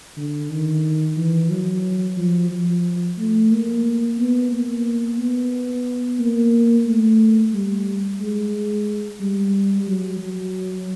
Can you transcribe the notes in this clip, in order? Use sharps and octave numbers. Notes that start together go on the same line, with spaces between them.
D3
D#3
E3
F#3
F3
F3
A3
A#3
B3
A#3
B3
A#3
A3
G3
G#3
G3
F#3
F#3